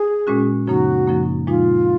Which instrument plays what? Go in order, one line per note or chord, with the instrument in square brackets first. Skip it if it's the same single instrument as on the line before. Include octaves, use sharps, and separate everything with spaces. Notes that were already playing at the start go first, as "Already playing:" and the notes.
Already playing: [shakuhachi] G#4
[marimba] A#2 G#3 C#4 F#4
[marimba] F#2 C#3 F3 A#3 D#4 [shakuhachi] F#4
[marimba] F#2 C#3 F3 A#3 D#4
[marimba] A#2 F3 G#3 D#4 [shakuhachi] F4